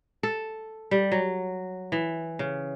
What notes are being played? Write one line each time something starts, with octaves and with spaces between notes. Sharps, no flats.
A4
G3
F#3
E3
C#3